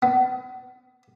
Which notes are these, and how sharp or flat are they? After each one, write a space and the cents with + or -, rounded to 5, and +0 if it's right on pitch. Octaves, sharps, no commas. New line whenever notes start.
B3 +35